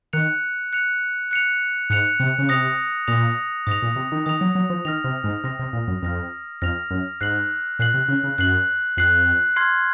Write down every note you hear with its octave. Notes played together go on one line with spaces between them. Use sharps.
D#3 F#6 C#7 F7
F#6 C#7 F7
F#6 C#7 F7
G#2 F#6 C#7 F7
C3
C#3
C3 D#6 A#6 F7
A#2 D#6 A#6 F7
G#2 D#6 A#6 F7
A#2
C3
D#3
D#3 D#6 A#6 F7
F#3
F#3
F3
D#3 F6 A#6 F7
C3
G#2
C3 F6 A#6 F7
C3
A#2
F#2
F2 F6 A#6 F7
F2 F6 A#6 F7
F#2
G#2 F#6 C7 F#7
A#2 F#6 C7 F#7
C3
C#3
C#3
F#2 F#6 C7 F#7
F2 F#6 C7 F#7
C6 F6 G#6 C7